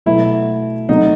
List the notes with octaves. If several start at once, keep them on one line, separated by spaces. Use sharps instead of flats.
B2 F#3 A3 E4
C3 F#3 A3 D#4